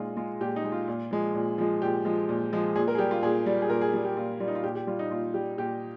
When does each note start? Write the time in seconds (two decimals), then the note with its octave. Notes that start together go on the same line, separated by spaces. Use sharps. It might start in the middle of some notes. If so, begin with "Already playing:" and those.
Already playing: A#2 G#3 D#4 F4
0.17 G#3 F4
0.40 A#2 G4
0.56 D#4
0.64 G#3
0.72 F4
0.88 A#2
1.11 F3 G#3
1.34 A#2
1.58 F3 G#3
1.81 A#2 G4
2.05 F3 G#3
2.29 A#2
2.53 F3 G#3
2.76 A#2 G#4
2.88 A#4
2.95 G#4
2.99 G3 G4
3.11 F4
3.22 A#2 G#4
3.46 G3
3.62 G#4
3.70 A#2 A#4
3.81 G#4
3.93 G3 G#4
4.05 G4
4.17 A#2 F4
4.40 G3 F4
4.48 D#4
4.55 F4
4.64 A#2 G4
4.75 G4
4.87 G3 F4
4.99 D#4
5.10 A#2 F4
5.34 G3 G4
5.58 A#2 G4